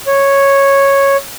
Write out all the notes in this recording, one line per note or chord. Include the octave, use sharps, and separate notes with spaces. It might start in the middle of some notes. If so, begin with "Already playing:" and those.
C#5